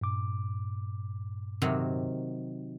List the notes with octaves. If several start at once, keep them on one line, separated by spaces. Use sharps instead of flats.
G2 A#2 D6
C3 D#3 F#3